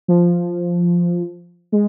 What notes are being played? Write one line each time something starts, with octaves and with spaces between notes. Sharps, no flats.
F3
G#3